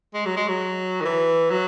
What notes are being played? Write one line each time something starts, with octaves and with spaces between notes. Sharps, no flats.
G#3
F#3
G#3
F#3
D#3
E3
F#3